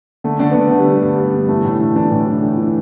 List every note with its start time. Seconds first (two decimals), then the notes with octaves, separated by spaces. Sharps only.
0.24 D3 A3
0.39 D3 D4
0.51 B3
0.55 D3 D4
0.71 D3 A3
0.79 G3
0.87 D3
0.95 G3
1.03 G2
1.18 G2
1.34 D3
1.49 E3 A3
1.65 A2
1.80 A2 D4
1.96 E3 D4
2.12 A2
2.27 E3
2.43 A2
2.58 E3